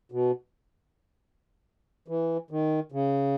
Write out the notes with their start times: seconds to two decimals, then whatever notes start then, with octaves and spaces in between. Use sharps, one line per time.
0.12 B2
2.08 E3
2.51 D#3
2.92 C#3